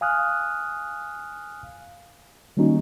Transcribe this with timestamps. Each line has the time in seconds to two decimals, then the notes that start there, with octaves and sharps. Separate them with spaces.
0.01 F5 G#5 D#6 F6 F#6
2.57 D#3 G3 A#3 C#4 D#4 F#4